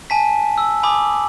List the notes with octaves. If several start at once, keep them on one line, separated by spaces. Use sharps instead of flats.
G#5 A5 B6
E6
G#5 B5 D6 D#6 F#7